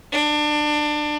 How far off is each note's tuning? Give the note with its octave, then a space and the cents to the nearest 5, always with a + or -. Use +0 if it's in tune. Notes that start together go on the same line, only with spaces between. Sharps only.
D4 +25